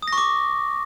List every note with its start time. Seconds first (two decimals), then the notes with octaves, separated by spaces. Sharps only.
0.02 D#6
0.08 A#6
0.13 C#6
0.18 D6